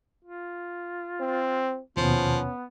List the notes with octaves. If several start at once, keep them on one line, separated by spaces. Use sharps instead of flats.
F4
C4
D#2 B2 F3 B3 C#4